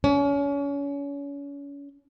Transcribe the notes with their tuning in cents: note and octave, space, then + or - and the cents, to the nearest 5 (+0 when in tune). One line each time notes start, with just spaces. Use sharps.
C#4 +35